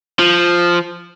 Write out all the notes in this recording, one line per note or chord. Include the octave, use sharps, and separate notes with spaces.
F3